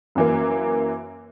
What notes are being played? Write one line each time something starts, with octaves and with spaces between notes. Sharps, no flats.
F#2 E3 A#3